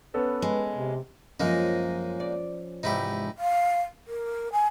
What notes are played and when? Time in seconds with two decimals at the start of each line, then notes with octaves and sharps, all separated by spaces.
0.14 B3 C#4 A4 B4
0.42 G#3
0.74 C3
1.40 F#2 F3 G#3 A#3 C#4 D#4
2.20 D5
2.83 E2 G#2 C3 D#4 E4 G4
3.38 F5
4.07 A#4
4.52 G#5